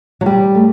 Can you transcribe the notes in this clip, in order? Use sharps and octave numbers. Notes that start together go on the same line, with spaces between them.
F#3
G3
A3